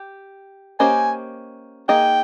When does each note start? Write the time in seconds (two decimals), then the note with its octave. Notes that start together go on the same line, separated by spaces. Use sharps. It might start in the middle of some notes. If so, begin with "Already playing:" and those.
Already playing: G4
0.79 A#3 C#4 G4 C5 D#5 G#5
1.89 A#3 D#4 G#4 D#5 G5